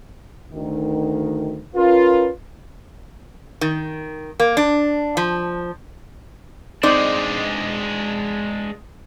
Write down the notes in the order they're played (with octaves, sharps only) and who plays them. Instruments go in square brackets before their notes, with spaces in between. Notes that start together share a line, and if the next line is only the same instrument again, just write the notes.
[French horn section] D2 D#3
[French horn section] C#4 A#4 B4 [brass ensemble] F4
[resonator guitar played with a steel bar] D#3
A#3
D4
F3
[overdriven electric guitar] G#3 D4 [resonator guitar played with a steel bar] C4 D#4 D5